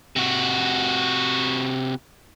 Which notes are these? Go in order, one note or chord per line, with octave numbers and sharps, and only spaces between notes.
C3 F#4